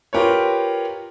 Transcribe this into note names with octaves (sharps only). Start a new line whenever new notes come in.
F4 G4 A#4 B4 C#5